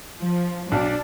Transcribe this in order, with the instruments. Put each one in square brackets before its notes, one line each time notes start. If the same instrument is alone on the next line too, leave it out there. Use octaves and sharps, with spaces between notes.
[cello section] F3
[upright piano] B1 [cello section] D4